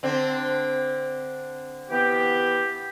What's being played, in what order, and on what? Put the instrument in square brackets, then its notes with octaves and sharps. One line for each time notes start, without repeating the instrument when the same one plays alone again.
[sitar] D3 C4
[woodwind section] E3 B3 G4